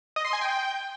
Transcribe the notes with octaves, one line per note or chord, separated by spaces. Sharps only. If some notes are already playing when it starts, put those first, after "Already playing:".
D#5
C6
G#5
G5